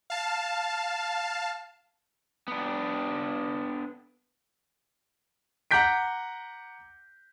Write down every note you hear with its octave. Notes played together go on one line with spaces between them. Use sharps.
F5 A5
B3 D4
F#5 A#5 D6 G6 B6 D7